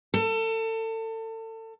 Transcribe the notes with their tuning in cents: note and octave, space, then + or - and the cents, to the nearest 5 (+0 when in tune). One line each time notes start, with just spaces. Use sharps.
A4 +30